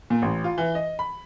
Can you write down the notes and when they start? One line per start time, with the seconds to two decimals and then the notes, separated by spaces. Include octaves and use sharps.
0.10 A#2
0.22 A1
0.44 F4
0.58 E3
0.75 D#5
0.99 B5